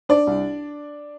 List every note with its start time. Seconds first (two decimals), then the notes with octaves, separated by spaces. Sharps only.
0.09 D4 D5
0.27 C2